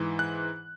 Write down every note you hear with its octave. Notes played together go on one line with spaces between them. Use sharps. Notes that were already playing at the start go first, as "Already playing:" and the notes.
Already playing: G#2 E3
F#6